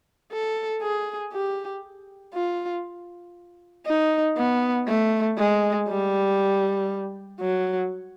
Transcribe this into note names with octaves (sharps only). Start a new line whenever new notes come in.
A4
G#4
G4
F4
D#4
B3
A3
G#3
G3
F#3